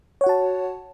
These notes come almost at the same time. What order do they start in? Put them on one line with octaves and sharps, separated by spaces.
C#5 F#5 F#4 A5